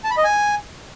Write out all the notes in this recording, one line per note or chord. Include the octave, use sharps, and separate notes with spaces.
A5
B5
D#5
G#5